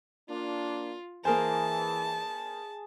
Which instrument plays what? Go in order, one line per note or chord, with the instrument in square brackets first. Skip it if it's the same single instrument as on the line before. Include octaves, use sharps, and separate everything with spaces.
[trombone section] A#3 D4 [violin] F4
[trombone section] E3 [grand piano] A#3 A#4 C5 [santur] G#4 G#5 [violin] A5